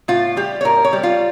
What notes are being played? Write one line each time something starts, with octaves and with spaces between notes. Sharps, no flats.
A2 F4
G3 G4
C#5
A2 A#4
C#5
G3
F4